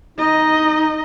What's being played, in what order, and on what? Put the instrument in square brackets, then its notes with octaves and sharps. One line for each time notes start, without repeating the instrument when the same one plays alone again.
[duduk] D#4 [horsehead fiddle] D#5